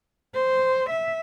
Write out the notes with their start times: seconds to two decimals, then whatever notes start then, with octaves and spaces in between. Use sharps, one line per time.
0.35 C5
0.90 E5